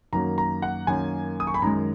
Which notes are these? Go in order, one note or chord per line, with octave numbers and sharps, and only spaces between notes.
F#2 D#3 F#3 A#3 A#5
A#5
F#5
F#2 D#3 F#3 A#3 G#5
D#6
C#6
B5
F#2 D#3 G#3 A#5